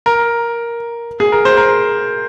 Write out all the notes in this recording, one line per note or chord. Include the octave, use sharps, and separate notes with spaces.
A#4
G#4
A#4
C5
A#4